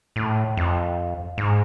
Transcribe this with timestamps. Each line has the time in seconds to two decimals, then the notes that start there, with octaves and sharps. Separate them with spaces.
0.16 A2
0.57 F2
1.38 G#2